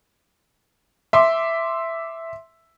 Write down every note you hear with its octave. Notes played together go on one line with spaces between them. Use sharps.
E5 C6 D6